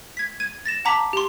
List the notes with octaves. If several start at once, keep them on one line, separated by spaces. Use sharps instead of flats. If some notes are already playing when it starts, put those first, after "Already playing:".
G#6 B6
G#6 D#7
A6 A#6 E7
F#5 A5 A#5 D6 B6 F#7
G4 C6